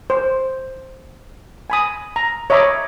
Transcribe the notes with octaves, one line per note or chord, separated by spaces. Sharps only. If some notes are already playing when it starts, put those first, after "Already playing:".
C5
G#5 B5 D#6
A#5
C#5 D#5 E5 A#5 B5 D6